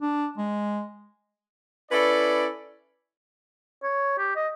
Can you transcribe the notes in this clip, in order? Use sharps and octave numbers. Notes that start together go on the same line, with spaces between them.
D4
G#3
C#4 E4 A4 B4 D5
C#5
G4
D#5